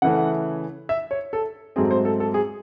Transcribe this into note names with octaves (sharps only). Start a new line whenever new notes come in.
C#3 E3 A3 C#4 F#5
E5
C#5
A4
G#2 F#3 A3 C4 G#4
C5
A4
A4
G#4